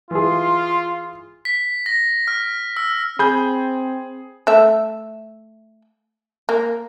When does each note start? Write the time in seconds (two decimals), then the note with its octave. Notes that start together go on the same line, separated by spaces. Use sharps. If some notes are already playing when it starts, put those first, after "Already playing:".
0.11 E3 F4 G#4 C6
1.45 B6
1.86 A#6
2.28 F6
2.77 E6
3.19 C4 G#4 B5 G6
4.47 A3 E5
6.49 A#3